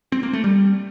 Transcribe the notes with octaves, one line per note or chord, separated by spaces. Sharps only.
C4
A#3
A3
G3